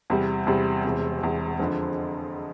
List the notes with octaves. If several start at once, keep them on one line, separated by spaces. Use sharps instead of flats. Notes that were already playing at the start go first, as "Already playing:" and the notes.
E2 C3 G3
E2 C3 G3
E1 E2 C3
E1 E2 C3
F2 D3 F3 C4